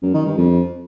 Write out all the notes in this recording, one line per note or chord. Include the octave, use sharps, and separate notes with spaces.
F#2
D#3
G2
F2